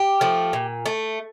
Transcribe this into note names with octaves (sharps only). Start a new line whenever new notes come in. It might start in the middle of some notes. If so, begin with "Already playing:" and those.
Already playing: G4
F3 A3
A#2
A3